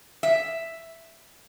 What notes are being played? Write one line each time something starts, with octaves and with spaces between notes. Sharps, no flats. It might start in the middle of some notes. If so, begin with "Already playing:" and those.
E5